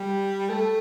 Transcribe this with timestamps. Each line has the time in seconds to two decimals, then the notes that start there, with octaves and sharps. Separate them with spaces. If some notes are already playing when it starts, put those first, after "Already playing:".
Already playing: G3
0.50 A3